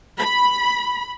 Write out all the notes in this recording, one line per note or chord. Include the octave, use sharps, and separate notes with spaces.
B5